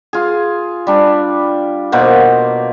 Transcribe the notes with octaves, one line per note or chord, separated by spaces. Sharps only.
F4 G#4
G3 D4
B2 A#3 C5 F#5